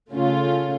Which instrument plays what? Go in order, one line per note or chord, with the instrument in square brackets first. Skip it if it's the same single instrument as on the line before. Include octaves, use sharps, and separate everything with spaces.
[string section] C#3 A3 C#4 F4